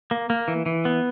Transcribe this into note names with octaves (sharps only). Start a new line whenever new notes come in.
A#3
A#3
E3
E3
B3